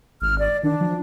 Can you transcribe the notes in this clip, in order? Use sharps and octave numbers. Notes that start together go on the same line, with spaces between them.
G#1 F6
D5
D#3 D4
F3